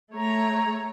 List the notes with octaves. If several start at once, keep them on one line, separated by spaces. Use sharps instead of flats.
A3 C#5 A#5